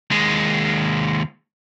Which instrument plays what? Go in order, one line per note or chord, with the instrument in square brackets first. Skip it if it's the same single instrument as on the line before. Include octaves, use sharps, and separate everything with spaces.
[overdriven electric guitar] D#2 G#3